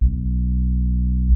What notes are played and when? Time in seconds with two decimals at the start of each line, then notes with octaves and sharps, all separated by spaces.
0.01 B1